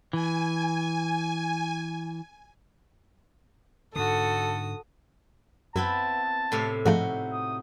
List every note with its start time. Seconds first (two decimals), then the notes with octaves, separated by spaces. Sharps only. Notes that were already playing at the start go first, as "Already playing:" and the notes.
0.13 E3 G#5
3.96 G#2 D3 F#4 A4 D#6
5.76 F#2 B3 C4 E4 A5
6.52 A2 C3 F5
6.85 G#2 F3 A3 D#4 F#4
7.32 D#6